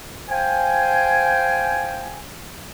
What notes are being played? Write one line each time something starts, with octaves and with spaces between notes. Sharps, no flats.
C5 F5 G5 G#5